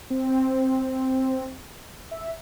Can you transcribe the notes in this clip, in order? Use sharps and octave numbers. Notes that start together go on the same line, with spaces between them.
C4
E5